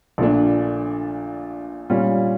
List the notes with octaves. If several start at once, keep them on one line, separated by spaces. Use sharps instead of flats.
A#1 A#2 A3 D4
A#2 G3 C#4 F4